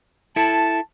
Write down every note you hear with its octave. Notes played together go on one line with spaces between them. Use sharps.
E4 A4 A5